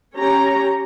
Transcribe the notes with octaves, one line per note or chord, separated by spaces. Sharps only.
C#4 G4 C#5 A#5